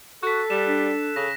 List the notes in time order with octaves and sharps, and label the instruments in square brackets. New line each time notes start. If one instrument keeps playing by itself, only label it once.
[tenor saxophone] F#4 [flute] A4 [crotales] F#6 B6
[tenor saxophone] G3 [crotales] E7
[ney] D4
[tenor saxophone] C#3 [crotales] A#6